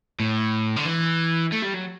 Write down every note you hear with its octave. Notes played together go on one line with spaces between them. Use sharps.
A2
D3
E3
A3
G3
F#3